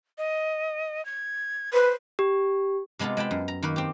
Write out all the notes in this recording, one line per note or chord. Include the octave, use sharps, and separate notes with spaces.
D#5
G#6
B4 C5
G4
C3 G#3 B3 F4 A4
G#3 G5 A5 B5
F#2
A#5
D#3 A#3 B4
C4 G4